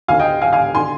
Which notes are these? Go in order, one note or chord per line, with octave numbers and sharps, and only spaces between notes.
D2 D3 F5 G#5
D#5 G5
F5 G#5
F5 G#5
D3 G#5 C6